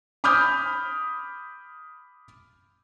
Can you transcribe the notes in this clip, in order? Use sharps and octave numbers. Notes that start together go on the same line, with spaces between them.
B5 D6 D#6 F6 G6